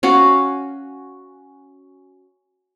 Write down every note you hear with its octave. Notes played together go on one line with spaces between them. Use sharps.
C#4 F#4 F5 F#5